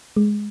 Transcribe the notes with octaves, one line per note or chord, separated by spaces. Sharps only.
G#3